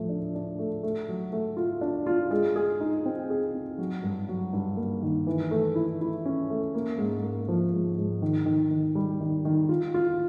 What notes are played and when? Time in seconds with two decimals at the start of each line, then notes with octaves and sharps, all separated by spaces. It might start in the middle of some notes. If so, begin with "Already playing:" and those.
Already playing: A2 F3 A3
0.09 D4
0.35 D4
0.59 A3
0.83 A3
1.09 F#3
1.33 A3
1.57 F4
1.81 D4
2.06 F4
2.31 G#3
2.56 G#4
2.80 D#4
3.06 C4
3.30 G#4
3.54 C4
3.78 F#3
4.03 G2
4.29 F#3
4.53 G2
4.77 A#3
5.02 D#3
5.27 E3
5.51 A3
5.75 E4
6.01 E4
6.26 C#4
6.50 A3
6.75 A#3
6.98 G#2
7.23 A#3
7.48 F3
7.73 G#2
7.98 G#2
8.22 D#3
8.46 D#3
8.71 D#3
8.95 G3
9.20 D#3
9.45 D#3
9.69 F4
9.94 F4